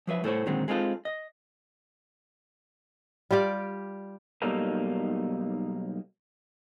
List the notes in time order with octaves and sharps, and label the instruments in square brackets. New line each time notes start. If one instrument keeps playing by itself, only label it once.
[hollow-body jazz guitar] F3 F#3 B4 E5
A2 A4 C5 C#5
A#2 D3 D#3 F#3 G#3 C4
G#3 C4 D#4 F4 A4
D#5
[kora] G3 F4 G4 D5
[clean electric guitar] B1 B2 G3 A#3 D#4 A4